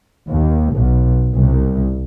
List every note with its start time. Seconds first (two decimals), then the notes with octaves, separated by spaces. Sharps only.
0.28 D#2
0.77 B1
1.35 C2